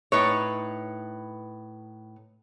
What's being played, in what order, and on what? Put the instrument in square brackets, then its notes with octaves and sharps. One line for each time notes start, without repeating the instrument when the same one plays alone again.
[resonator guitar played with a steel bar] A2 D#4 B4 C#5